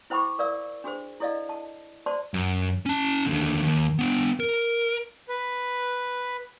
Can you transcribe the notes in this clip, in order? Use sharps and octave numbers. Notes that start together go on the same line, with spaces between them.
E4 C5 G5 B5 C#6 D6
A#4 D5 F5 E6
D4 F#4 G#4 C5
E4 A4 D5 D#5 F5
A5
F#4 C5 D5 A5 C6
F#2
C#4 A5
D#2 D3
D#2
B3 D4
A#4
B4